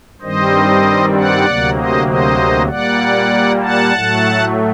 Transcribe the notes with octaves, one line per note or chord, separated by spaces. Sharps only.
G2 D#3 G3 C4 C5 D#5
D5 F#5
D2 C3 F#3 A#3
C5 D#5
C5 D#5
A#2 G3 A#3 D5 F#5
F#5 A5
A2 F#3 A3